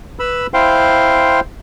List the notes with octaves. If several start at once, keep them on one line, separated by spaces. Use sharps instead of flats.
B4 B5 E6
E4 C5 F5 G5 C6